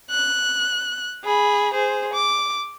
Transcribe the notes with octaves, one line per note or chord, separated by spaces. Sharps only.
F#6
G#4 B5
G#4 C5
D6